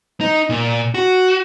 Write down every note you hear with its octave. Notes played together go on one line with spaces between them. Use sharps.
D#4
A#2
F#4